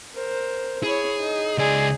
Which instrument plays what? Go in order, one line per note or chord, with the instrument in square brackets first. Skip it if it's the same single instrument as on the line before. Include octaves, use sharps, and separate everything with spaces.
[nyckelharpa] A#4 C5
[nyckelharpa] E4 C#5 [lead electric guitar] G#4
[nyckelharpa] D#4
[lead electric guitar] C#2 D5 [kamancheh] G#4